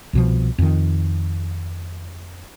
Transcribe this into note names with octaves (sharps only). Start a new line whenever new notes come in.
C2 B2 F3
F2 D#3